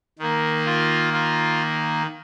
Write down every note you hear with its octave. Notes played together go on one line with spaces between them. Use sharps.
D#3 A#3
F4
F4